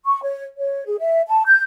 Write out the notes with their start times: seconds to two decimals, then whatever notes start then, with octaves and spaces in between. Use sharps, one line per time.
0.06 C#6
0.23 C#5
0.58 C#5
0.87 G#4
0.99 E5
1.28 A5
1.46 G6